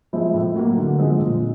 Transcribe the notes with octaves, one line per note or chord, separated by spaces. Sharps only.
F3 G#3 C4 E4
A2
F#3 A#3
D3
F3 G#3 C4
A#2